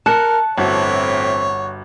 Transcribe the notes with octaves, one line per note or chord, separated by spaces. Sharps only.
A#4 A5 F#6 C#7
G1 A2 E3 C4 F#4 C#5